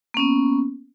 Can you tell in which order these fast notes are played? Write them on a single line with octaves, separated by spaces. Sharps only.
A#3 C#4 B3